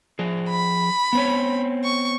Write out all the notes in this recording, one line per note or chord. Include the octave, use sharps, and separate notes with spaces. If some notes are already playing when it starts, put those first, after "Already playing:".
F3 G#4
B5
B3 C4 C#5
C#6